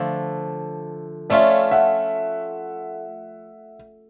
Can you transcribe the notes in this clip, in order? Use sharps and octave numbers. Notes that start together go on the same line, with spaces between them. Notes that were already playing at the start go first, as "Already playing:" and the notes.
Already playing: D3 F3 A3 D4
A3 C#4 F4 A4 D5 E5
E5 F#5